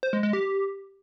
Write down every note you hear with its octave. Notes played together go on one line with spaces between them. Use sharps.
C5
G#3
G#3
G4